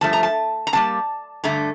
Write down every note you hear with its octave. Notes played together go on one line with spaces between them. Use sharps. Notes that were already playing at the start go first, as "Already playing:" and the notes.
G2 F3 A3 A5
A#5
A5
A#5
C3 G3 A#3 A5
G2 D3 A3 A#5